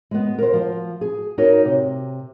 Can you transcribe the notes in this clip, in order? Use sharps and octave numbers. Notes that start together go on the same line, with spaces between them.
G#3 B3
A#4 C5
F3
G#4
D#4 F#4 A#4 C#5
C3